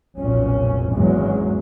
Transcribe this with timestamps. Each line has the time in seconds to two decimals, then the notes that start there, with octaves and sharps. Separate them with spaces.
0.16 F1 B1 A#2 C#4
0.92 G#1 E2 C#3 F#3 G#3